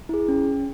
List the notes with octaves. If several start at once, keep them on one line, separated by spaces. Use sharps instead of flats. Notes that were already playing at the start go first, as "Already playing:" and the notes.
E4 G#4
C#4